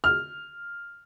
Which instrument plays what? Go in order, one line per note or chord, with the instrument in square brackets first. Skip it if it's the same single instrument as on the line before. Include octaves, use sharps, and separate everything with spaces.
[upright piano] F6